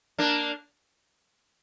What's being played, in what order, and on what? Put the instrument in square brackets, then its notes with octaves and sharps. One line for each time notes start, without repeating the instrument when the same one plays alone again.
[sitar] A#3 D4